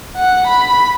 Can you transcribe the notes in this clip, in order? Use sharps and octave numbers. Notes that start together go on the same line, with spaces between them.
F#5
B5